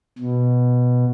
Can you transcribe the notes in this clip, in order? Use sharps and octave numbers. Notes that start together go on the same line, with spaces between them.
B2